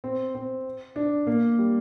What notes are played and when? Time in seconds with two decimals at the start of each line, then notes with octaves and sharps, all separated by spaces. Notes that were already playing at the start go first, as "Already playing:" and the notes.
0.04 C4
0.35 C4
0.96 D4
1.27 A#3
1.59 G3